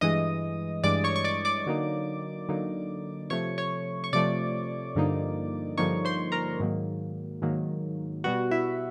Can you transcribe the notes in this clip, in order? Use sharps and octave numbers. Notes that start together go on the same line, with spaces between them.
G2 E3 G#3 D#5 D#6
G2 E3 G#3 D5 D6
C#5 C#6
C#6
D5 D6
D5 D6
D3 F#3 A#3 D#4
D3 F#3 A#3 D#4
C3 F3 A3 C#5 C#6
C#5 C#6
C#6
C3 F3 A3 D5 D6
G2 D3 F3 A#3 D#4
G2 D3 F3 A#3 D#4 C#5 C#6
C5 C6
A#4 A#5
G#2 D#3 F#3 A#3
G#2 D#3 F#3 A#3
B2 G3 B3 F#4 F#5
E4 E5